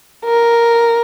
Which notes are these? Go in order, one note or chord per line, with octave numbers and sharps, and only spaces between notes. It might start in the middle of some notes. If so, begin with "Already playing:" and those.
A#4